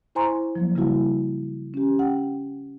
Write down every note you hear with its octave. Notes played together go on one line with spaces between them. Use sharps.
E4 C5 G#5 A#5 C6 C#6
F3 F#3 A#3
C#3 G3 A#3 E4 F#4
C#4 G4
F#5 G5